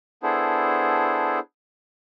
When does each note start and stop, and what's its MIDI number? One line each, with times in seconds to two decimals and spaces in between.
0.23 1.39 59
0.23 1.39 62
0.23 1.39 64
0.23 1.39 68
0.23 1.39 69
0.23 1.39 72